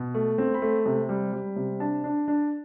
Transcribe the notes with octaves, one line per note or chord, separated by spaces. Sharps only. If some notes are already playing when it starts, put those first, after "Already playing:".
Already playing: B2
A3
C4
B5
A3
C3
G3
G3
C3
D4 A5
D4
D4